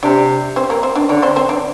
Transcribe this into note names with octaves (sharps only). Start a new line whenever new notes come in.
C3 D4 D5
C4 C5
A#3 A#4
C4 C5
D4 D5
D3 D4 D5
C4 C5
C4 C5
D4 D5